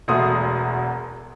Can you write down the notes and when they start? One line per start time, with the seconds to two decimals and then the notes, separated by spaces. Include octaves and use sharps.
0.08 E1 E2 A3 F#4 C6 D#6